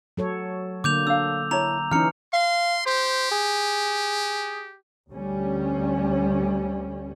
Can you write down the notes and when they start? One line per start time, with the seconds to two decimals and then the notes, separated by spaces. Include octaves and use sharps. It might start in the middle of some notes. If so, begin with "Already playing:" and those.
0.17 F#3 A4 C#5
0.84 D3 A#3 D6 G6 F7
1.07 D4 F5 E6
1.51 E4 C#5 A5 A#5 F7
1.91 E3 C#4 D#4 A#5 F6 C#7
2.33 F5 C6
2.86 G4 C5
3.31 G#4
5.10 D2 G3 C#4